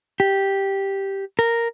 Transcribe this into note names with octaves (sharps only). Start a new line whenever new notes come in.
G4
A#4